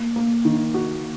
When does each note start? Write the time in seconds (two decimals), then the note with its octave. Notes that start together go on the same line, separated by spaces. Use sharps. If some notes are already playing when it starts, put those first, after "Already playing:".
Already playing: A#3
0.16 A#3
0.45 D#3
0.74 F#4